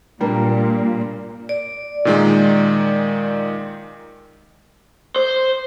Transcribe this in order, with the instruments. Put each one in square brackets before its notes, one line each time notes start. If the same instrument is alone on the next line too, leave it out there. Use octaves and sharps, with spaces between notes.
[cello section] A#2 [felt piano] G3 A#3 D4
[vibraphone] D5
[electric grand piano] A#2 D#3 G#3
[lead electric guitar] C5